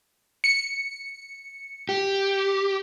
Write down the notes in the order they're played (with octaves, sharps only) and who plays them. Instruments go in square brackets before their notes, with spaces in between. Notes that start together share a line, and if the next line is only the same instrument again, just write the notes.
[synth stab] C#7
[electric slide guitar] G4